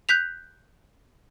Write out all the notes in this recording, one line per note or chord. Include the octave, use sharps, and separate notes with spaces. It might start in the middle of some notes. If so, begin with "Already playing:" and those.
F#6 G6 B6 F7